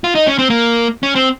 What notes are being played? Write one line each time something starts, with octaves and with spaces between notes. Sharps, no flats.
F4
D#4
C#4
C4
A#3
C#4
C4